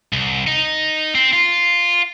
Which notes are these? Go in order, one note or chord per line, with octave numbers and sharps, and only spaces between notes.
C2
D#4
C4
F4